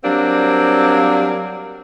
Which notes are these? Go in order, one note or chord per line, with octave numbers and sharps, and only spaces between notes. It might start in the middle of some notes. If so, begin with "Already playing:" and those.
F#3 G3 A#3 C4 D4